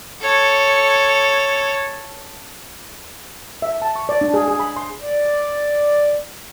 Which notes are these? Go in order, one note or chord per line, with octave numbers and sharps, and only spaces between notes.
A4 C#5
E5
A5
C#6
D5
D4
G#4
G#4
B5
C6
D5